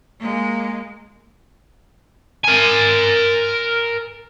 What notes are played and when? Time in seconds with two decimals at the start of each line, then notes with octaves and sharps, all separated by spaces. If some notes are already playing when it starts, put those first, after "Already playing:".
0.19 G#3 A#3
2.44 A#4 G#5